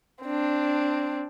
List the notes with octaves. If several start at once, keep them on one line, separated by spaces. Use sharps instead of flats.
C4 D4